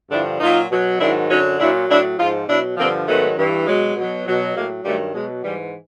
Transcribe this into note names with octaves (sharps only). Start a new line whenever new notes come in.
G2 D3 F3 D4 E4
A#2 F#3 D#4 F4
B2 F#3
G#2 D#3 F#3 D4 E4
F#2 D3 F#3 C#4 D#4
A#2 F#3 D4 E4
A2 F#3 D4 E4
G#2 F3 D#4 F4
B2 F#3 D4 E4
G2 D3 F3 A#3 C4
G#2 D#3 F#3 A3 B3
G2 E3
B2 F#3 G#3
B2 F#3
B2 F#3
A2 F#3 G#3 A#3
G2 D#3 F#3 G3 A3
B2 F#3 G#3
G#2 E3 G3